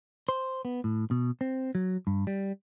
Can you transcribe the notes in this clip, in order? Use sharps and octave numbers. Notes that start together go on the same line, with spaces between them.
C5
B3
A2
B2
C4
F#3
G2
G3